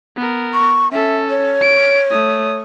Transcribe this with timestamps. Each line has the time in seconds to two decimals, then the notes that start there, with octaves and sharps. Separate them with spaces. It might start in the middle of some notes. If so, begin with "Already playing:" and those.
0.16 B3 A#4
0.53 C#6
0.92 C#4 A4 E5
1.30 C#5
1.61 D7
2.10 A3 D#6